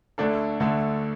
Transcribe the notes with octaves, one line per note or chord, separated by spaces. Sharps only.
D2 D3 A3 D4 A4
D2 D3 A3 D4 A4